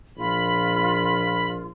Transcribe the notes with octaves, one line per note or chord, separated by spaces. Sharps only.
A#1 F4 B5